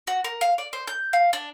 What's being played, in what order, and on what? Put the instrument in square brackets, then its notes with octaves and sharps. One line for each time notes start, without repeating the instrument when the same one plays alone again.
[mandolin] F#4
A#4
F5
D5
C5
G6
F5
D4